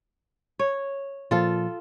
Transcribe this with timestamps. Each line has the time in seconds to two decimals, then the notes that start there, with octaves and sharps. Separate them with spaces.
0.59 C#5
1.31 A#2 F3 F4 A4